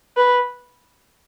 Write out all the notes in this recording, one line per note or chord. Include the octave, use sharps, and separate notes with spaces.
B4